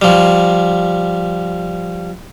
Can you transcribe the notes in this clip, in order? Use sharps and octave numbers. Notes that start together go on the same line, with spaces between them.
F3 G3